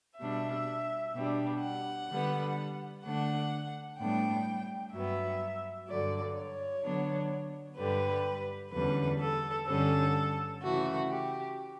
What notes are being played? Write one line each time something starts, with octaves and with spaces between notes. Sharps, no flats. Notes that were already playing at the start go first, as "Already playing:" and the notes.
B2 G3 D4 E5
B2 G3 D4
F#5
D3 G3 B3
D3 A3 D4 F#5
A2 G3 B3 D4 G5
G2 F#3 B3 E5
G2 D3 F#3 D5
C#5
D3 F#3 B3 D4
G2 D3 G3 B4
E2 D3 G3 C#4 B4
A4
G2 D3 G3 C#4 A4
C#3 E3 A3 F#4
G4